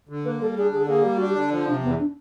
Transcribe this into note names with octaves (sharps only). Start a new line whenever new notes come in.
D3
A#3 B4
G3 A4
D4 G#4
D3 G#4
A#3 G#4
G3 G4
D4 F#4
G4
D3
F3
C3 D4
E2 B3
D4